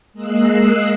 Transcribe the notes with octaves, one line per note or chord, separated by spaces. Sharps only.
G#3 A#3 D#5 E6 F#6 C7